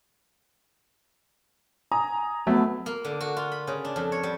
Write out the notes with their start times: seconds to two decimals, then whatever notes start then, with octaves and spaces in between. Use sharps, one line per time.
1.92 G#5 A#5 D#6
2.47 F#3 A3 B3
2.86 A#3
3.05 D3
3.21 F#4
3.37 F4
3.52 B5
3.67 C#3
3.85 D4
3.96 F2
4.12 C#5
4.23 G3